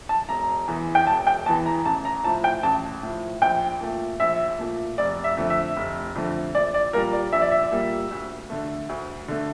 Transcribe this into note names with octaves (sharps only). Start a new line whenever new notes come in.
A5
E1 A#5
E2 E3
G5
E1 A5
G5
E2 E3 A5
A#5
A1 A5
A#5
A2 F3 A5
G5
A1 A5
A2 F3
A#1 G5
A#2 A3
A#1 E5
A#2 A3
F1 D5
E5
F2 D3 A3
E5
F1
F2 D3 A3
A#1 D5
D5
A#2 G3 A#3 A#4
D5
A#1 E5
D5
E5
A#2 G3 A#3
D2
D3 A3
D2
D3 A3